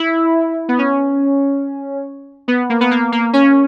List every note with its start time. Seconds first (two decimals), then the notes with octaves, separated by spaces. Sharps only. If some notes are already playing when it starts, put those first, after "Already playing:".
Already playing: E4
0.69 B3
0.78 C#4
2.48 B3
2.70 A#3
2.81 B3
2.91 A#3
3.12 A#3
3.33 C#4